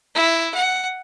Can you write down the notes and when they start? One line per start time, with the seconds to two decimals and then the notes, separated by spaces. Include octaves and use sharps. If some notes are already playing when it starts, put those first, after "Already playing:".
0.15 E4
0.54 F#5